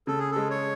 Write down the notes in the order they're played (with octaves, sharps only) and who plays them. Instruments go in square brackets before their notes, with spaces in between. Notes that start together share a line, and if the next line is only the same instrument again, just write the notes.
[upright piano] C#3 [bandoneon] A4
[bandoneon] G#4
[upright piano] G#3 [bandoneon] A4
[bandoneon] C#5